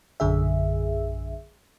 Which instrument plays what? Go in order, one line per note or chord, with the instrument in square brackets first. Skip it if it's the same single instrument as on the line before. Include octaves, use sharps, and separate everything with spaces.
[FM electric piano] A#1 F#2 D3 G#4 E5